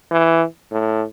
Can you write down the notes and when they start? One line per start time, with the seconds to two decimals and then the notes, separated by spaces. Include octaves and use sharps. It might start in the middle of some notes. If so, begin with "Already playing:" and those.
0.12 E3
0.72 A2